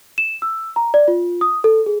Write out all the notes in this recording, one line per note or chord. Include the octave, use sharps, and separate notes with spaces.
E7
E6
A#5
D5
F4
D#6
A4
G#4